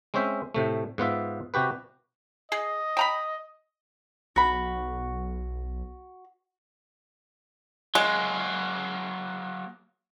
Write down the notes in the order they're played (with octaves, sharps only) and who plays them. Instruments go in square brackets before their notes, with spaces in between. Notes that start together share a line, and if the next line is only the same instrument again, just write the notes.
[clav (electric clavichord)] G#3 C4 C#4 C5 E5
A2 C3 A3
G#2 B3 F4 E5
C3 F#4 G4 B4
[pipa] G#4 [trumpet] D#5
[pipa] G5 A#5 B5
[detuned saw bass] B1 [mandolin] F#4 B5
[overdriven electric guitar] F#3 A#3 [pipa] G#3